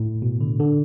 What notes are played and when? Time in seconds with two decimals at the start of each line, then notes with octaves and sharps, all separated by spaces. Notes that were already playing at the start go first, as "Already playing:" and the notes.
Already playing: A2
0.22 B2
0.41 D3
0.60 D3